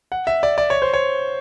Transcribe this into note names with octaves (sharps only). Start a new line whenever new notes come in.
F#5
E5
D5
D5
C#5
C5
C#5